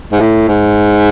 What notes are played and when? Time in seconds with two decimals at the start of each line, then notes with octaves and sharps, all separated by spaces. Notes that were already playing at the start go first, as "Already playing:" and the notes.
0.12 G#2
0.20 A2
0.48 G#2